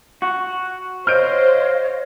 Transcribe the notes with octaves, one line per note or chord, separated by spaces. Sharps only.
F#4
C5 C#5 D#5 F5 F6 G6 D7